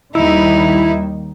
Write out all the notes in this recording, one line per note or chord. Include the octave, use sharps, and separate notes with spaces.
D#2 D#3 G3 D#4 E4